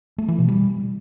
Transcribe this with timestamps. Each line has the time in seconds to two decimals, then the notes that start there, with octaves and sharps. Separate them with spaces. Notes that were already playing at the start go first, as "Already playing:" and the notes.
0.18 A3
0.28 E3
0.38 B2
0.48 G3